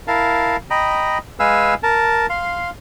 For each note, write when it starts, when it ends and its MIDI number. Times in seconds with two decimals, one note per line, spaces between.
0.08 0.57 64
0.08 0.57 70
0.08 0.57 77
0.08 0.57 81
0.70 1.18 75
0.70 1.18 79
0.70 1.18 82
0.70 1.18 83
1.40 1.74 56
1.40 1.74 71
1.40 1.74 77
1.40 1.74 80
1.40 1.74 88
1.83 2.27 70
1.83 2.27 81
2.30 2.70 77
2.30 2.70 84